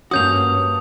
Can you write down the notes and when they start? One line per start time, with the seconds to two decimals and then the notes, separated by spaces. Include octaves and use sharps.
0.11 G2 A#3 C#4 F#4 D#6 G6 F7